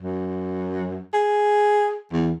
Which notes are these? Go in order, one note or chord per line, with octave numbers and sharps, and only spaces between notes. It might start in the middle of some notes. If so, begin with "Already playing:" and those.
F#2
G#4
E2